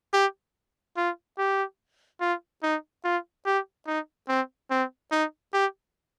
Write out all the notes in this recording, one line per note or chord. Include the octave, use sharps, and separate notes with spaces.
G4
F4
G4
F4
D#4
F4
G4
D#4
C4
C4
D#4
G4